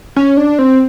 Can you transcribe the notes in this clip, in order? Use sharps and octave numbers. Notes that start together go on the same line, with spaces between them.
C#4
D4
C4